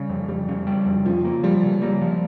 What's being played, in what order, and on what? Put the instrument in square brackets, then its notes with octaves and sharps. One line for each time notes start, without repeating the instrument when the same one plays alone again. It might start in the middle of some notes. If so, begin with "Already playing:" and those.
Already playing: [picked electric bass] C#3 [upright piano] G3
[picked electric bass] F2
[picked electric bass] F2 [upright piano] G3
[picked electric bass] C#3
G3
F2
[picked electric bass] C#3 [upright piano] F3
[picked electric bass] A#3
[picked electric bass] F3 [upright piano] G3
[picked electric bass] C#3
[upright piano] G3 [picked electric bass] A#3
[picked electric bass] F3